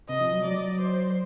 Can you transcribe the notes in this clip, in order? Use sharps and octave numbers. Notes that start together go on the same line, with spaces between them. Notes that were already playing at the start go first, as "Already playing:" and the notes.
C3 D#5
F3
F#3
F#3 D5
C5